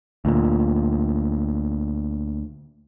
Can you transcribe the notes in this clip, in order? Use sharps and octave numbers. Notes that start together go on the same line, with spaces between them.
D2 A#2